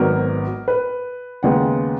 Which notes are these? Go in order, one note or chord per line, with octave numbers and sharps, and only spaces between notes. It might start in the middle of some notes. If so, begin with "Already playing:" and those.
Already playing: G#1 G#2 F#3 B3 A#4
B4
D#2 C#3 G#3 B3 F#5